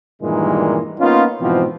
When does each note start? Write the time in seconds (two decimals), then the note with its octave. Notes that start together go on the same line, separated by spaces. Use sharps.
0.22 G2 A#2 D#3 E3 G3 G#3
1.00 A#3 B3 C#4 D#4 F4
1.40 G#2 B2 E3 F3 B3 C4